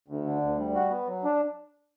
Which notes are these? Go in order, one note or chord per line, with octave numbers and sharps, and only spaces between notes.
D2
D3
D2
G3
F#4
B3
F#3
D4